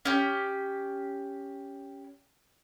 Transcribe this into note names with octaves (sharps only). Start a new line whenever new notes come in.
C#4 G4